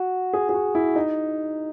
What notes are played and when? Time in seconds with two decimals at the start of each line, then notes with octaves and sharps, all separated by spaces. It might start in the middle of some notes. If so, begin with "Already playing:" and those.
Already playing: F#4
0.33 G#4
0.49 G#4
0.54 F#4
0.75 E4
0.96 D#4